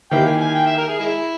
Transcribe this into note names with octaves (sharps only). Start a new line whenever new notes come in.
D#3 A#3 E4 G4 G5
G#5
G#5
G5
E5
A#4
G#4
G#3 E4